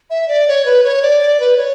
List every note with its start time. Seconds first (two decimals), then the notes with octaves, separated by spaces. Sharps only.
0.10 E5
0.28 D5
0.48 C#5
0.65 B4
0.84 C#5
1.02 D5
1.21 D5
1.40 B4
1.57 C#5